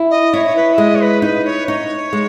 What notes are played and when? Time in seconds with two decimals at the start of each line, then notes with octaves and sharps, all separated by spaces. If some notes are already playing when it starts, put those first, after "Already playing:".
Already playing: E4
0.10 D#5
0.33 E4 C#5
0.46 C#5
0.56 B4
0.74 E5
0.78 G#3 D#5
0.95 C#5
1.01 B4
1.22 D#4 B4
1.45 C#5
1.68 D#4 C#5
2.13 G#3